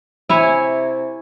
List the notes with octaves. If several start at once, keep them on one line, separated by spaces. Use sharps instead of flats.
C3 E4 C#5 G#5